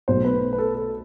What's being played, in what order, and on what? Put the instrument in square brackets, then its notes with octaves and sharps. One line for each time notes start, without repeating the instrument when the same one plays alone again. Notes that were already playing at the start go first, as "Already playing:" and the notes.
[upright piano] B1 B2 A3 [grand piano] C5
[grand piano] B4
B4
A4
A4